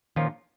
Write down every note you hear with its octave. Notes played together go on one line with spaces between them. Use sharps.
A#2 D#3 F3 C#4 F4